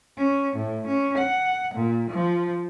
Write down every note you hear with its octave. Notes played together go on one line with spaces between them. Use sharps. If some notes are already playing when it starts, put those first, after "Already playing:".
C#4
A2
C#4
F#5
A#2
F3